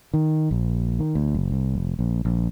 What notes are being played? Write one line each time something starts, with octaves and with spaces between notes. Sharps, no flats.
D#3
A#1
D#3
D2
F#1
C2
F1
A#1
A#1